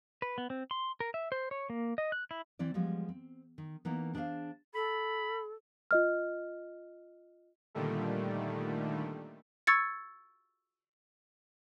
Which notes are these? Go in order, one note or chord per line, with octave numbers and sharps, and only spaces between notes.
B4
B3
C4
C6
A#4
E5
C5
C#5
A#3
D#5
F#6
E4
E3 C4 E4 D5
F3 G3 G#3 B3
C4
D#3
E3 A#3 B3 D#4 E4
D4 G#4 C5 D#5 F5
A4 B5
F4 D#5 F6
A#2 D3 D#3 G3 A3
C#6 E6 G#6 A6 C#7